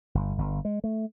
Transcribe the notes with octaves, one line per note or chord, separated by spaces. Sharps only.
G1
G1
G#3
A3